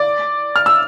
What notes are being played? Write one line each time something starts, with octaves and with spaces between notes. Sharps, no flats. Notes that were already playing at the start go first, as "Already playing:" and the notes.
Already playing: D5 D6
F6
E6